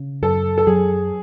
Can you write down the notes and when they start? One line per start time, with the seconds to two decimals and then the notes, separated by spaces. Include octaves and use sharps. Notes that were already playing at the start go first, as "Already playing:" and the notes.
Already playing: C#3
0.22 F#2 A4
0.58 A4
0.67 F#3 G#4